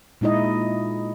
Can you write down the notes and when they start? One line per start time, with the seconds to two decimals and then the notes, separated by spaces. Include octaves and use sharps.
0.21 A#2 G#3 D#4 E4 D#5